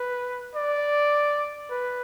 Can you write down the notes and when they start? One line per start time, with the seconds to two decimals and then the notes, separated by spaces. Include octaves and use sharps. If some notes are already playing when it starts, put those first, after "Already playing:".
Already playing: B4
0.55 D5
1.70 B4